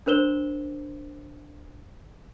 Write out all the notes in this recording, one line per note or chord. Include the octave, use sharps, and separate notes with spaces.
D4 A#4 C5 E7 G7